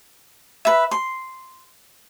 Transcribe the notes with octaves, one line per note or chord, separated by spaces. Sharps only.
B4 E5
C6